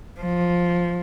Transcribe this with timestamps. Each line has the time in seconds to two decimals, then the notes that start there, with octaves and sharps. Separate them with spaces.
0.21 F3